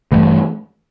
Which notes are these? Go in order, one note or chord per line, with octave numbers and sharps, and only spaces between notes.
G2 E3 A3